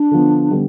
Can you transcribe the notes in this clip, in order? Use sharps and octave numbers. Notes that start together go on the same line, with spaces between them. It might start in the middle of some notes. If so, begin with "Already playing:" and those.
Already playing: D4
D3 F3 B3
D3 G3 B3